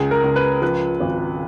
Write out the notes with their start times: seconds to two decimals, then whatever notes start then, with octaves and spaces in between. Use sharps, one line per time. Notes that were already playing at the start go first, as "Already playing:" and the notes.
Already playing: C#2 G#4
0.11 A#4
0.24 C#2
0.36 B4
0.62 F3 B4
1.00 G#1